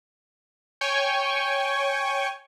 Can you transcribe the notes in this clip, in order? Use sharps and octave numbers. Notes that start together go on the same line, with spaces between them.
C#5 G5 G#5 C#6